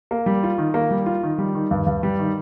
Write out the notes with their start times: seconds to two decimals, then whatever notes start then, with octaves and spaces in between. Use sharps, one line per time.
0.11 A#3
0.26 G3
0.43 F4
0.58 D#3
0.74 A#3
0.91 G3
1.06 F4
1.23 D#3
1.38 G3
1.55 D#3
1.71 G2
1.87 G2
2.03 G3
2.19 D#3